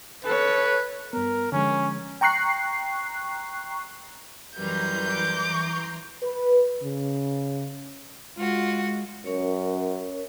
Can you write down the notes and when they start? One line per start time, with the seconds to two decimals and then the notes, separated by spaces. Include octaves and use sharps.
0.24 A4 B4 C#5
1.13 G2 B3 A#4
1.52 D3 F3 G#3 C#4
2.21 G5 A#5 C#6 F#6 C7
4.58 F#2 E3 G3 B4 A#5 C6 G6
5.10 D6
6.23 B4
6.82 C#3
8.37 G#3 F4 F#4
9.26 F#2 C#4 A#4 C#5